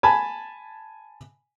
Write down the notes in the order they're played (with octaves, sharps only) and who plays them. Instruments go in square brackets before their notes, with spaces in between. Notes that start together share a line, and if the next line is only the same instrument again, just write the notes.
[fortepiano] G#5 A5 B5